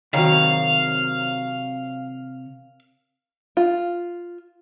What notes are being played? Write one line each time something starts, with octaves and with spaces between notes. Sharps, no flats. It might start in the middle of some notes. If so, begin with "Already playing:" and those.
C3 D#3 F#3 C#5 F5 A#5
F4